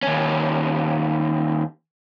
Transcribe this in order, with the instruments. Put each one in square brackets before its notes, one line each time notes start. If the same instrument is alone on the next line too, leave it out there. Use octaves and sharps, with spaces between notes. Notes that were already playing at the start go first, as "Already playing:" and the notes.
[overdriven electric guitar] D#2 C#4